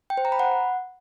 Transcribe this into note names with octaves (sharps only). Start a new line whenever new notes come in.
G5
C5
A#5
B5
F#5